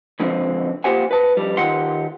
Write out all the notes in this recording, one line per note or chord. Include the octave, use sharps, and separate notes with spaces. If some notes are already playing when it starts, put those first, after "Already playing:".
C#2 D3 F3 C4
A#3 F4 G4 C5 F#5 G#5
B4 A5
F2 G3
D#3 F4 G4 F#5 C6